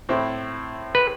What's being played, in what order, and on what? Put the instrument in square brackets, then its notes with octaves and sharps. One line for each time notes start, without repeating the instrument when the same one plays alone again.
[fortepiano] A2 C4 E4
[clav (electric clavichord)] B4